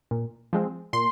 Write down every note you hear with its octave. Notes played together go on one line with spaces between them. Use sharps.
A#2
F3 G#3 C4
A#2 C6